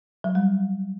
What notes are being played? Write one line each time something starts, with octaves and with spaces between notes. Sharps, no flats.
F#3
G3